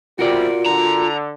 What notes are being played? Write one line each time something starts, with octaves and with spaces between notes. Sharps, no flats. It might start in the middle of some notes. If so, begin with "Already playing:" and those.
C3 G3 F4 F#4 A#4 D5
D3 A#5